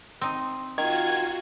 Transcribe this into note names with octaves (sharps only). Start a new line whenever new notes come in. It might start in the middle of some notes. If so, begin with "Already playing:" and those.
C4 D#4
D#3 F4 F#4 G#6